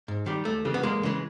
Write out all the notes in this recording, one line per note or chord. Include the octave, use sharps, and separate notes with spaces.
G#2
D#3 G3
D#2 A3
C#3 E3 G3
B3
E2 G#3 A#3
C#3 E3 G#3